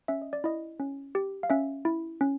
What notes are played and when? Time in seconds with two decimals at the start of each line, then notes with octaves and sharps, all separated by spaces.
0.08 C#4 E5
0.22 D#5
0.33 D5
0.44 E4 D#5
0.80 C#4
1.15 G4
1.43 F5
1.50 C#4 E5
1.85 E4
2.21 C#4